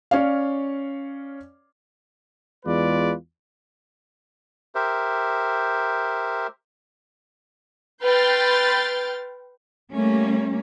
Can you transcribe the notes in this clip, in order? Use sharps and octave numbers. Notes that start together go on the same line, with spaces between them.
C#4 C#5 D5 F5
E2 G#3 F4 B4 D5
G4 A#4 C5 E5
B4 G5 C6 F6 G6 A6
G3 A3 A#3 C#4